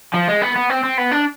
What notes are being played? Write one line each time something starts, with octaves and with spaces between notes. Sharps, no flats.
F3
G#3
B3
B3
C4
C4
B3
D4